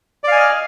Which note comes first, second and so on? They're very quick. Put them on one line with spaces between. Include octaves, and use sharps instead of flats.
D5 F5 G#5 D#5 F6